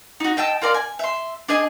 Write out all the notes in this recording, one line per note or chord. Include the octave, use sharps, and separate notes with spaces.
D#4 F#4
D#5 G5 A5 E6
F4 A#4 D5 C6
G#5
E5 C6
D4 G#4 D#5 G#5